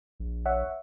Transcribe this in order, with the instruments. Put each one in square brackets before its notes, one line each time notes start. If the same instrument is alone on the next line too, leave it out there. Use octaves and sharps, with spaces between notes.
[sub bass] A#1
[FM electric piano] C#5 E5 F#5